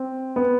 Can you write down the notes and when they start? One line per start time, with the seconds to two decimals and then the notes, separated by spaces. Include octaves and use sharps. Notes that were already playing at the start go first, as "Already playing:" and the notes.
Already playing: C4
0.36 B3